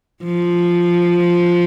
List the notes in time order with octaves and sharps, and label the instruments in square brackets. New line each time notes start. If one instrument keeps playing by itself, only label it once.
[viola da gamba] F3